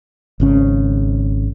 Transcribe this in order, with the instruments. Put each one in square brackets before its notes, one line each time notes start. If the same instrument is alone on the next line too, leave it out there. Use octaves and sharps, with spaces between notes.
[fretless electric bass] G#1 C#3 C#4